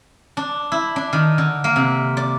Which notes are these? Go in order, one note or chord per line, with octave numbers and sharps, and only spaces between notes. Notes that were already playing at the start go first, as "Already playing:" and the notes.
D4
E4
D4
D#3
D3
A#3
C3
D5